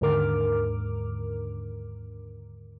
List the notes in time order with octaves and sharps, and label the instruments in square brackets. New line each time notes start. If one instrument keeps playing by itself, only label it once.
[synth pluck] D#2 G#2 D3 A#4 D6 F6